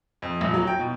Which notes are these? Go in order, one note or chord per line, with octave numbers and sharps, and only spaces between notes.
F2
D#1
F#3
G5
B2